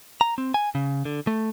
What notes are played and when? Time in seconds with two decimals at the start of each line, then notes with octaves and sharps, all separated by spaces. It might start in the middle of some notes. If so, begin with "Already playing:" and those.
0.21 A#5
0.38 C4
0.54 G#5
0.75 C#3
1.05 D3
1.27 A3